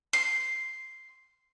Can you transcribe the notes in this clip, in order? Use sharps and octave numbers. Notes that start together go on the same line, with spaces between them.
C6